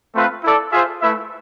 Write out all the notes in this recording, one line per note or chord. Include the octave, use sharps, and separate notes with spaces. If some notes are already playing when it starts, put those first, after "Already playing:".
A3 C4 F4 B4
E4 A4 D5
F4 G#4 C5 E5
A3 E4 B4 E5